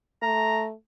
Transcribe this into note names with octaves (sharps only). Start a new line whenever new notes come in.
A3 A#5